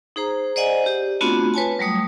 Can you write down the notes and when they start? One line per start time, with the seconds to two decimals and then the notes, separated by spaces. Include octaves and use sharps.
0.16 D#4 G#4 C5 A#5
0.56 C5 D5 D#5 F#5 G#5
0.86 G4
1.21 A3 B3 C4 D4 F4 F#4
1.54 B4 C#5 G#5 A5
1.79 F#3 G3 A3 D#6